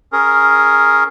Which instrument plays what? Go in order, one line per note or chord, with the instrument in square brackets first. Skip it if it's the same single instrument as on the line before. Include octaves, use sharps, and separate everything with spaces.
[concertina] C#4 G#4 A#4